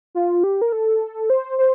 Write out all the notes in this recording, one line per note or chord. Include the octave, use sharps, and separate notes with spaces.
F4
G4
A#4
A4
C5
C5